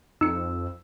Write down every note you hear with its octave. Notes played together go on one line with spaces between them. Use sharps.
F2 D#4 E6 C#7